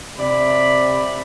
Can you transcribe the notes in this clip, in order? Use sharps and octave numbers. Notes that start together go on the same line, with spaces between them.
C3 D5 B5